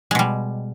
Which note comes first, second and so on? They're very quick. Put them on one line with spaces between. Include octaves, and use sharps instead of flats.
G#3 B2 G3